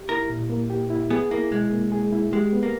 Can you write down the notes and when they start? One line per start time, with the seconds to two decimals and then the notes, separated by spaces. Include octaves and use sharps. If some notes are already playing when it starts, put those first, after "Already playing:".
Already playing: G4
0.09 E4 A#4
0.30 A#2
0.50 A#3
0.70 G4
0.90 E4
1.10 B3 G#4
1.31 A#3 E4
1.52 B2 G#3
1.72 A#3
1.92 G#4
2.12 E4
2.33 G#3 G4
2.53 B3
2.63 A#3